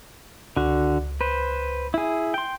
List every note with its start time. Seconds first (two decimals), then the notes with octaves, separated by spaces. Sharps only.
0.56 C#2 D3 F#4
1.21 B4 C5
1.94 E4 G#4
2.34 G5 C6